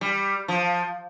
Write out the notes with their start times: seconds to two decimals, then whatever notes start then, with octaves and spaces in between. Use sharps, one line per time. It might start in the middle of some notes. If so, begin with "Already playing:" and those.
0.01 G3
0.48 F3